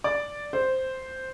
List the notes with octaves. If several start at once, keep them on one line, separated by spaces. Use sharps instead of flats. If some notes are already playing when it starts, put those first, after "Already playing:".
D5
C5